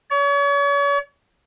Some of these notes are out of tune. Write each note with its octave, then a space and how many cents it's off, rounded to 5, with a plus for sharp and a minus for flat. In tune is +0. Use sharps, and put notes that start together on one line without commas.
C#5 +40